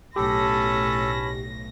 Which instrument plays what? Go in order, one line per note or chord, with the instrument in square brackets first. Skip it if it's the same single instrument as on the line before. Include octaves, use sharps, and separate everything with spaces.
[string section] B1 A2 A#6 [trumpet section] C#4 A5 B5 [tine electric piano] G4 [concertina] A4